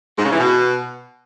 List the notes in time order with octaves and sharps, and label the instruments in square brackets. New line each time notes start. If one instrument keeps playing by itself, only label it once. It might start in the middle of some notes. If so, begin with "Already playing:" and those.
[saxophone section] G#2
C#3
E3
B2